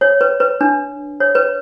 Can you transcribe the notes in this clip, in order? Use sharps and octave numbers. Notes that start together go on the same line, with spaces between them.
C#5
B4
B4
D4
C#5
B4